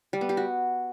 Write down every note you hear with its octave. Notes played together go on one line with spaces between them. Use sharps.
G3
B3
G4
F#4